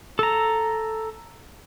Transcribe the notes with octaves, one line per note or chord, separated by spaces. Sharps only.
A4 A#5